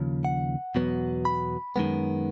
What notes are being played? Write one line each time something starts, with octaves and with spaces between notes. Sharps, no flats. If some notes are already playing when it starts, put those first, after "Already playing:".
Already playing: D#2 C#3 F3
F#5
E2 B2 F#3 B3
B5
F#2 D#3 G#3 B3